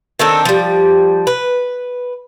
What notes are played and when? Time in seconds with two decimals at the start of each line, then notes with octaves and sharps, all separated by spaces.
0.19 D#3 C4 D4 A4
0.45 F3 G3
1.27 B4